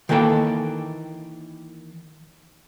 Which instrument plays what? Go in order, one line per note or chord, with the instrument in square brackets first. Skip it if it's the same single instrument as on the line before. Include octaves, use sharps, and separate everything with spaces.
[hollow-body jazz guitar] D#3 E3 A#3 A4 G5